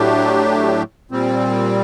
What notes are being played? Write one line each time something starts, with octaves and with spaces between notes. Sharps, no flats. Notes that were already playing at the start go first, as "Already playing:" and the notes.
Already playing: A2 F#3 A3 D4 G4
A#2 G3 C4